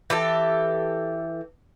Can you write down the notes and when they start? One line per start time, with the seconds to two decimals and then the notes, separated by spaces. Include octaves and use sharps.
0.10 E3 G4 A4